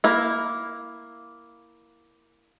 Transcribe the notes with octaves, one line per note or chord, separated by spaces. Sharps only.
A#3 E4